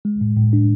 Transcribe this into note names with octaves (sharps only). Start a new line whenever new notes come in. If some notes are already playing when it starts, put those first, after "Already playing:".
G#3
A2
A2
D4